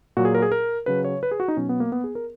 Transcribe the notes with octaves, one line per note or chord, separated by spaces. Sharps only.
A#2 F#3 F#4
G#4
A#4
G#4
A#4
C#3 F#3 B4
C#5
B4
G#4
F#4
D#4
B2 F#3 C#4
B3
A#3
B3
G#4
A#4